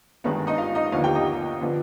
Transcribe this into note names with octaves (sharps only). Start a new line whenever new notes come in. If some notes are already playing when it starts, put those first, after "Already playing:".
G1 G2 D#3 G#3 B3 B4
D#4 D#5
F4 F5
D#4 D#5
D#2 D3 F3 B3 F4 F5
G4 G5
D#4 D#5
D3 F3 B3